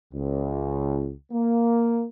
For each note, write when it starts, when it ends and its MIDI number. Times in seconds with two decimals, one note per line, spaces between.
0.14 1.12 37
1.32 2.06 58